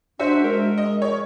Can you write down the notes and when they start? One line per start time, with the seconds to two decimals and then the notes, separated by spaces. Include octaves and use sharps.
0.20 D4 F#4 C5 E5
0.44 G#3 A#4
0.78 D#5
1.02 C#5